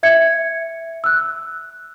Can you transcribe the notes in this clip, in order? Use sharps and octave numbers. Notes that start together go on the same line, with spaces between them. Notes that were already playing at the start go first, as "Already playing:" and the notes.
E5 G#6 C#7
E6 F#6